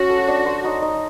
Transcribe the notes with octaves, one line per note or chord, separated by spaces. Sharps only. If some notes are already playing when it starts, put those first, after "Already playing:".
Already playing: C#4 F#4
A4
D4
C5
D#4
D#4